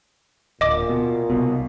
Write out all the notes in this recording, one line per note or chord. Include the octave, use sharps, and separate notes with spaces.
D1 A#2 D#5 D6
B2
C2 B2